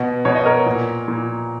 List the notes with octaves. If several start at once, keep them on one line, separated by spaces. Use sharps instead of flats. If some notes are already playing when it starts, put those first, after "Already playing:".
Already playing: B2
B2 C#5
D#5
A#4 C#5
A#2
A#2